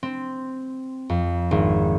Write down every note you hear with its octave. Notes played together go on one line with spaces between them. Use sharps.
C4
F2
G#1